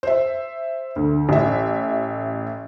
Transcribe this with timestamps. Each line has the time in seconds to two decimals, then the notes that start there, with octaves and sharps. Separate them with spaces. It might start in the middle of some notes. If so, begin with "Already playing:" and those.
0.03 C5 E5
0.96 D2
1.29 A1 E5